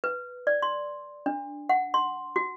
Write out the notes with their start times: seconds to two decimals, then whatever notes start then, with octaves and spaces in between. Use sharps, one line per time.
0.04 B4
0.47 D5
0.62 C6
1.26 D4
1.69 F#5
1.94 C6
2.36 F#4